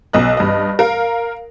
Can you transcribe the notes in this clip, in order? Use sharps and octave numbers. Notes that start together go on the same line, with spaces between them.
B1 D#5 F#6
G2 D#5
A#4 F5